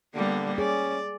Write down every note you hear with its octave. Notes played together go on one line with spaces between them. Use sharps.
D3 G3 A#3 B3
C#4 G#4 D5